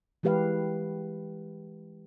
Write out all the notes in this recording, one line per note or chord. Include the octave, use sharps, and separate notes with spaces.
E3 G#3 G4 B4 F5